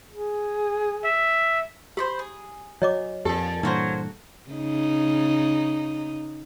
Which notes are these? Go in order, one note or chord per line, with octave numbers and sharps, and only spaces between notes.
G#4
E5
G4 C5 D#5 B5
G#4
F#3 C#5 D#5 D6
F2 A#2 G4 A4
G2 A#2 E3 F#3 A#3 F#4 C5
C#3 D#4